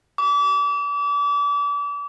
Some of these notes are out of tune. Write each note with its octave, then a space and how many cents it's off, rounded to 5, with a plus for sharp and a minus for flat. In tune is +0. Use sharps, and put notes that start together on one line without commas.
D6 -35